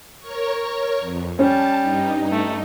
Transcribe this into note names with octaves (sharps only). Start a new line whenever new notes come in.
A#4 C#5 C#6
F2
G3 C#4 A5
G2 D#4
A3